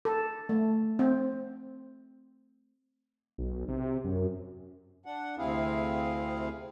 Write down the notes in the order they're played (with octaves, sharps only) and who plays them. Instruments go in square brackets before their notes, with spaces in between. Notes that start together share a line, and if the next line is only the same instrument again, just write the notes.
[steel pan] A4
A3
C4
[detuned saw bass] B1
C3
F#2
[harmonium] D4 F#5
D2 C3 C4 E4 G#4 F5